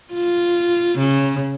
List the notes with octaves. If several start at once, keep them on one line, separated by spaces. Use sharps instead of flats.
F4
C#3